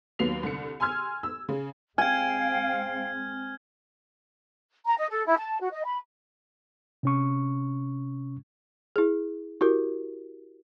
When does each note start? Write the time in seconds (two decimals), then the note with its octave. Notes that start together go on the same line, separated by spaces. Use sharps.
0.19 D#2 F#3 B3 C7 F7
0.43 C2 D3 C#7
0.80 G#5 C6 E6 F6 G#6
1.23 E6
1.49 C#3
1.98 G#3 C4 F5 G5 G#5 F6 G#6
4.86 A#5
4.98 D#5
5.10 A4
5.26 E4
5.38 A5
5.61 F#4
5.72 D#5
5.84 B5
7.03 C3 C#4 C#6
8.96 E4 G#4
9.61 E4 F#4 G4 A#4